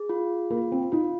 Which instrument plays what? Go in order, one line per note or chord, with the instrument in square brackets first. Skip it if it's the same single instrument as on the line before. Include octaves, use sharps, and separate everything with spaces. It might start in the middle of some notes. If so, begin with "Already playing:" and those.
Already playing: [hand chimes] G#4
F4
[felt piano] A#3 [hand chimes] F4
[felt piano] C4
[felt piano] D#4 [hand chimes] F4